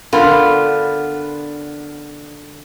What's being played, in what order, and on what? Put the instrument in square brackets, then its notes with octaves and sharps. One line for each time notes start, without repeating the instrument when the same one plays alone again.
[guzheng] D3 [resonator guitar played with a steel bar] B3 F4 [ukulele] A#4 B5